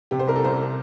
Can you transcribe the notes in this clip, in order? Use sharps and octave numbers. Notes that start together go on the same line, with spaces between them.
C3 G4
C5
C2 A#4
A4
C2 C5